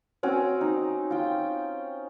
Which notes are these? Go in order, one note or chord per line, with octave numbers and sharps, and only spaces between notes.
C4 C#4 F#4
D#4
F4 G5